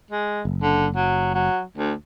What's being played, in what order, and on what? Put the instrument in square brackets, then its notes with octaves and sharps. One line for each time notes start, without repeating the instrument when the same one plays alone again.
[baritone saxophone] G#3
[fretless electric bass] F#1
[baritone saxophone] D3
F#3
F#3
D2